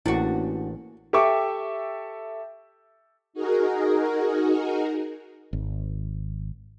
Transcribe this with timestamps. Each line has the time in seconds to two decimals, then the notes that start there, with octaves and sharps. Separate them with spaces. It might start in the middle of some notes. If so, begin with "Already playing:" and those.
0.06 A1 A#3 C#4 D4 E4 F#4
1.13 G4 A4 E5 G5 C#6 D6
3.33 D#4 F#4 G#4 A#4
5.53 G#1